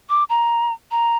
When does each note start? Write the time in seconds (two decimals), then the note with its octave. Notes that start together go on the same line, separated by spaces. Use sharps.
0.09 D6
0.29 A#5
0.91 A#5